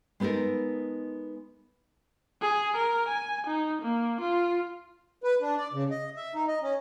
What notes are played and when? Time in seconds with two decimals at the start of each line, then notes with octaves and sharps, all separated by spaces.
0.20 G#3 B3 D#4 A4 A#4
2.42 G#4
2.76 A#4
3.08 G#5
3.47 D#4
3.82 A#3
4.21 F4
5.24 B4
5.41 D4
5.58 D5
5.73 C#3
5.91 D#5
6.16 E5
6.35 D#4
6.48 D#5
6.62 C#4